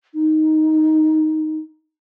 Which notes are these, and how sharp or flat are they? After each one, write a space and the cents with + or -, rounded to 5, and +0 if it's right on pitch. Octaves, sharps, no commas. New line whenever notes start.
D#4 +5